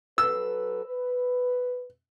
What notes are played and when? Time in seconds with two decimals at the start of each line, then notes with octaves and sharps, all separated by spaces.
0.18 F#3 A4 B4 E6
0.85 B4